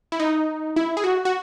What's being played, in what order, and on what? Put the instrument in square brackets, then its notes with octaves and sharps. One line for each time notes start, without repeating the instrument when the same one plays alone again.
[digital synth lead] E4
D#4
E4
G#4
F#4
F#4